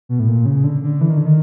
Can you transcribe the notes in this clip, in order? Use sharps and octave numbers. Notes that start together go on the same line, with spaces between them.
B2
A2
A#2
C#3
D3
D3
E3
D#3
D3
D#3